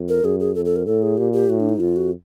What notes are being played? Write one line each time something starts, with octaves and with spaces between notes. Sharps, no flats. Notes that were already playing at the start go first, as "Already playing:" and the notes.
Already playing: F2
A#4
F#2 G#4
G#4
F2 A4
A4
A#4
A2 A4
G#4
A#2 G4
G4
A2 F#4
D4
D#4
F2 F4
F#4